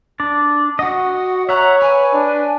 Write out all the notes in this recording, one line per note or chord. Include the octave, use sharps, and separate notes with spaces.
D4 D5
F#4 D#5 F#5
C#5 E5 F#5 A#5
B4 G#5
D4